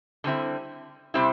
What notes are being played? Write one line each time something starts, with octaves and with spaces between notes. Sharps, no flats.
D3 G3 C4 E4
C3 G3 C4 E4